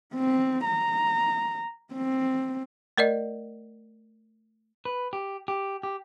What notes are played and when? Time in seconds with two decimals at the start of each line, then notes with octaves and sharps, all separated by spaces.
0.15 C4
0.65 A#5
1.93 C4
2.98 A3 A#4 D5 D#5
4.85 B4
5.13 G4
5.48 G4
5.83 G4